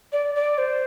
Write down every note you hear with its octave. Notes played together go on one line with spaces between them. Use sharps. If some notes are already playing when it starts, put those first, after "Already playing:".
D5
D5
C5